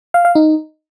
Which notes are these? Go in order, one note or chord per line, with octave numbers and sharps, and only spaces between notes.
F5
F5
D#4